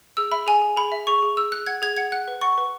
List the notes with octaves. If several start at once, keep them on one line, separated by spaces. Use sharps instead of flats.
G#4 E6
E5 B5
G#4 G#5
G#4
G#4 B5
E5
G#4 C#6
G#4
G#4 E6
G#4 F#6
F#5 G#6
G#4 G#6
F#5 G#6
F#5 F#6
B4
F#5 C#6
B4